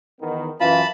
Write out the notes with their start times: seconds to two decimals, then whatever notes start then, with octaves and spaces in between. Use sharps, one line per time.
0.21 E2 D#3 B3
0.60 F#2 E3 F4 A5 B5